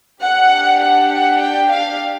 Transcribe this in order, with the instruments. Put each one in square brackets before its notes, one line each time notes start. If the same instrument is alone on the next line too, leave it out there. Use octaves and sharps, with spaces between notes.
[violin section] D4 G4 F#5
F#5
F#5
G5
F5